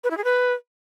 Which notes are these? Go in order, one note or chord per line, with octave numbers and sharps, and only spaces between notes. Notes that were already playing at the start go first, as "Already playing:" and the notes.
B4
E4
G#4
B4